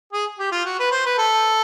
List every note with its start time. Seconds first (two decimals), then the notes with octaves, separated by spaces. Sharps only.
0.13 G#4
0.39 G4
0.52 F4
0.65 F#4
0.79 B4
0.92 C5
1.06 B4
1.18 A4